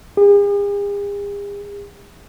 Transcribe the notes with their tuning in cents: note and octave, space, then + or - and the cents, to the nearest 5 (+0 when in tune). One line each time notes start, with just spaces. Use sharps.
G#4 -45